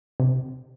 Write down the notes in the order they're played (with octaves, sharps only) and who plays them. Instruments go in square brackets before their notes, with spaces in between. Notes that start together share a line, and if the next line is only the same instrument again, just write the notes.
[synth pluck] C3